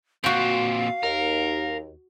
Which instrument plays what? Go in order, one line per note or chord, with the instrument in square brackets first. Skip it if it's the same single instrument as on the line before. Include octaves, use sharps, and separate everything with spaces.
[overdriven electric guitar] A#2 C4 [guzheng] F#4 G5 [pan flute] F5
[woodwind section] D#2 [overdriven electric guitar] A#4